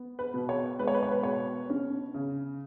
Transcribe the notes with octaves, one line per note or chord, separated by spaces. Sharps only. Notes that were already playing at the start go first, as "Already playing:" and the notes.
Already playing: B3
B4
B2
C#5
G#3 B4
C#5
B4
C#5
B4
B2 C#5
C#4
C#3